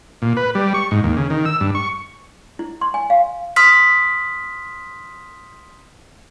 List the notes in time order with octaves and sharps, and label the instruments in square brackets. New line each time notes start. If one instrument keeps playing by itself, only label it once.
[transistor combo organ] A#2
B4
G3
C#6
G#2
D#2
C#3
D#3
E6
G2
C#6
[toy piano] E4
C6
G#5
F5
[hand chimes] C6 D#6 F6 B6